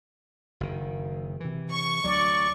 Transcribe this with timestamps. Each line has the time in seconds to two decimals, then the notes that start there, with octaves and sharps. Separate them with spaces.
0.60 F#1 D#3
1.40 C3 E3
1.71 C#6
2.04 D2 F#3 D5